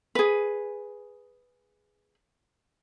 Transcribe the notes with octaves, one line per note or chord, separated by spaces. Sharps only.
G#4 B4